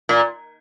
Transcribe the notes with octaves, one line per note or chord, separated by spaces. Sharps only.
A#2